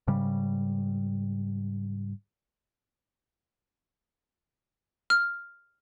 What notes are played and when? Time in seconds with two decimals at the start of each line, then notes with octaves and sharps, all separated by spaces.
0.08 G#2 C#3 G3
5.10 F6